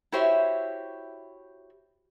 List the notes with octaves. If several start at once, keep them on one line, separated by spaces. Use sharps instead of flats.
E4 F#4 G4 C5 C#5 E5